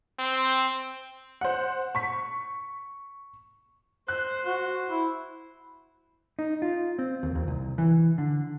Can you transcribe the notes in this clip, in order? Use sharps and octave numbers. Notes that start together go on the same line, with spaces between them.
C4
C5 F#5
C#6 B6
C5 F#6
F#4
E4
D#4
F4
C4
D#2
D#2
C2
E3
D3